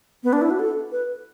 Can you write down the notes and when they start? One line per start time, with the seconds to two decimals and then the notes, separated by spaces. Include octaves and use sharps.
0.24 B3
0.33 D4
0.42 E4
0.50 F#4
0.59 A4
0.92 B4